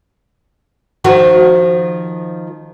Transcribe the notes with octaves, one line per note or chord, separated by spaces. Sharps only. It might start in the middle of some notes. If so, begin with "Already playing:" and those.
D#3 F3 F#4